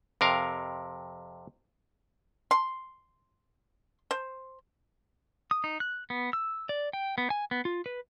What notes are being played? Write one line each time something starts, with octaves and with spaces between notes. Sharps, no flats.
F2 C3 A#4 F5
C6
C5
D#6
D#4
F#6
B3
E6
D5
G5
B3
G#5
B3
F4
B4